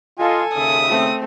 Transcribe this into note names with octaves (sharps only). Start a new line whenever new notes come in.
F4 A4 D#5 G#5
D#2 C#3 E5 D#6
A3 C4